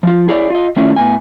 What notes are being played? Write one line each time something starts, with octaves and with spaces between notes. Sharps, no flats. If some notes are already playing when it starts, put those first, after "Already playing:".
F3 F4
E4 G#4 C#5 D5
F4 D#5
D#3 A3 C#4 D4 E4 F4
A2 B3 G#5